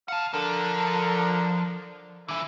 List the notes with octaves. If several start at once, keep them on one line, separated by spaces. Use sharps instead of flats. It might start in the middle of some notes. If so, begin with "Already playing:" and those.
F5 F#5 A5
D3 F3 A#4
D3 E3 E4